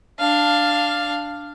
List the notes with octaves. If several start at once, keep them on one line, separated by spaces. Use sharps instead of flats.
D4 F5